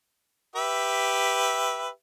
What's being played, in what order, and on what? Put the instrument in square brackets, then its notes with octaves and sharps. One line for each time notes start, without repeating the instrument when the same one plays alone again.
[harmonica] G4 B4 E5